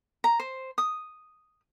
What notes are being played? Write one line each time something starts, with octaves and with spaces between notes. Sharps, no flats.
A#5
C5
D#6